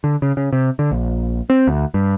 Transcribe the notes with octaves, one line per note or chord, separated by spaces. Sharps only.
D3
C#3
C#3
C3
D3
A#1
C4
D2
G2